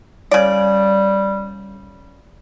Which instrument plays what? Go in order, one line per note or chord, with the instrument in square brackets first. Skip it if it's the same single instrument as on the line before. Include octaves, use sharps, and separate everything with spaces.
[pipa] C#3 D5 [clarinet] G3